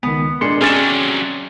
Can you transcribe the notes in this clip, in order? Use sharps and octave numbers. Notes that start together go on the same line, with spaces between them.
C#2 D#3 B3
A#2 G#3 D4 C6 C7 C#7
C3 F#3 C#4 G#4 D5 A6 E7